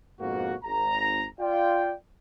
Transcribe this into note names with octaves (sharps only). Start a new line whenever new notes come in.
F2 G#2 B2 A#3 F#4
G#1 A#5
F4 D5 G5